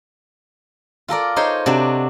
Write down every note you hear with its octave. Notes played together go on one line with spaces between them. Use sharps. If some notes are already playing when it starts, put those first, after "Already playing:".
F4 A4 A#4 D5
D#4 C5 C#5 C6
C3 D4 F#4